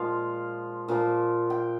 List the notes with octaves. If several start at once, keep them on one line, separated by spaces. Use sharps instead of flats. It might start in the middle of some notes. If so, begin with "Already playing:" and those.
Already playing: A#2 F3 G#3 F5
A#2 F3 A#3
G5